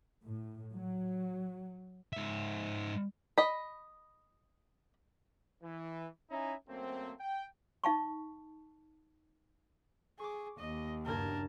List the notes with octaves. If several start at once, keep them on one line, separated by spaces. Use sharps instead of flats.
A2
F#3
G#2 E5
D#5 B5
E3
C#4 D#4 E4 E5 G#5 A#5
F#2 A3 A#3 C4
G5
D#4 F5 A5 C#6
G#4 C#6 D6
D#2 D#5
F#1 G2 A#4 A5 G#6